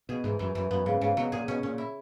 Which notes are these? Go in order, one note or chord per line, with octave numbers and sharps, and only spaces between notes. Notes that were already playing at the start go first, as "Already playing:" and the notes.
B2 G#4
G#2 E3
F#2 E3
F#2 E3
F#2 B3
G#2 C#3
G#2 C#3
B2 F#3
A#2 G#4
B2 C#4
A#2 C#4
E4